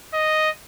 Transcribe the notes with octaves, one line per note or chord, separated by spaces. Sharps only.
D#5